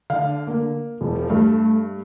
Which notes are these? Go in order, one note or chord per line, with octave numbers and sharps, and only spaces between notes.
D3 F5
A#3
E1 F3
G2 A3